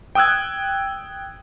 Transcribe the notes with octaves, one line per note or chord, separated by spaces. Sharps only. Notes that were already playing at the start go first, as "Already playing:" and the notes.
G5 D#6 E6 F#6 G#6